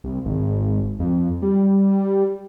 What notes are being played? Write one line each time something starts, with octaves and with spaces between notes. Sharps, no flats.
C2
G#1
F2
G3